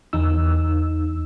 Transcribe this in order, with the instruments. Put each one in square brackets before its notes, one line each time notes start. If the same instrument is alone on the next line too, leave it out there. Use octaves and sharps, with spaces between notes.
[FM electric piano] E2 D#4 E6